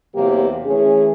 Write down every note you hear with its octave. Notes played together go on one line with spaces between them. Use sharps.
E2 C3 F#3 A#3 G4
E3 A3 C#4 G#4